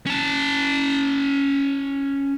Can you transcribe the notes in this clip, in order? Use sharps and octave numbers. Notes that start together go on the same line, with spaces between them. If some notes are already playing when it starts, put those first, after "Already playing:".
C#4 A5